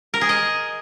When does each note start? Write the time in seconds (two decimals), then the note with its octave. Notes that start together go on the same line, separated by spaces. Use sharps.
0.14 A#4
0.21 G#4
0.29 D#5